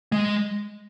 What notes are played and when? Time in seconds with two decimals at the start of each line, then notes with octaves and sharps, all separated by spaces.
0.12 G#3